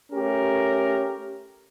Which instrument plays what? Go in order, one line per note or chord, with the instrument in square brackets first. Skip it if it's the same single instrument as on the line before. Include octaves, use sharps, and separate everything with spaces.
[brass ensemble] A3 C#4 G4 A#4